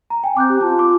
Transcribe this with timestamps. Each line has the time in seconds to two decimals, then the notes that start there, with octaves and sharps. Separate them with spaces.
0.10 A#5
0.24 G5 G#5
0.37 C4 D6 F#6 G6
0.50 G4
0.62 F4 A5
0.79 D6